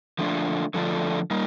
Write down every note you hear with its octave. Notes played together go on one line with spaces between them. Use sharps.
D3 F3 A3 D4 F4
D3 F3 A3 D4 F4
G3 A#3 D#4